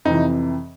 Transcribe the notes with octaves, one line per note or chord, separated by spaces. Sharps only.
F2 C3 E3 D#4